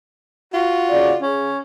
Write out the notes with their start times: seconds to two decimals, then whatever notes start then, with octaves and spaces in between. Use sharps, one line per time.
0.54 F4 F#4
0.90 D#2 C#3 D5
1.22 C#3 C#4